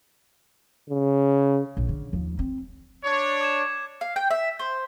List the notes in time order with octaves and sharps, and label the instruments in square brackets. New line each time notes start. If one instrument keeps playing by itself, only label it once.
[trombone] C#3
[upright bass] A#1
D3
D#2 F3
C4
[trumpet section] D4 C#5
[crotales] D6 G#6 E7
[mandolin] F5
G5
E5
C5